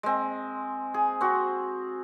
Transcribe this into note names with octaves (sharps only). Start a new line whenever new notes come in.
G#3 C4
G#4
C4 F#4